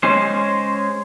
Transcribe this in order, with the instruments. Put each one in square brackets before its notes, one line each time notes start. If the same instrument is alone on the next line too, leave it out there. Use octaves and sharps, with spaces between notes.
[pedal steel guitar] G#3 C#4 C5